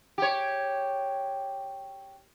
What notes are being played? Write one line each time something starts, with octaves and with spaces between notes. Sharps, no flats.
G4 C#5